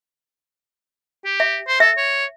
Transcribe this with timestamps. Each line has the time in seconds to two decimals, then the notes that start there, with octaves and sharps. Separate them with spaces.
1.25 G4
1.40 E5
1.67 C5
1.80 A4 E5
1.97 C#5